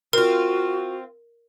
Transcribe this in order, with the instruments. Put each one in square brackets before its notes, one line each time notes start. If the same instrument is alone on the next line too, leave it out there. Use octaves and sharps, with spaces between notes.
[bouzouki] C4 F4 [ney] F#4 [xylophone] A#4